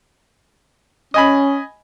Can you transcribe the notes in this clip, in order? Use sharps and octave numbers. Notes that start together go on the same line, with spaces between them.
C#4 D#5 G#5 B5